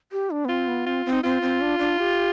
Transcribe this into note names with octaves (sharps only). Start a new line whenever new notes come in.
G4
D4
B3
C4 F4
B3
C4 F4
C4
D#4
C4 F4
C4
D4
D4
G4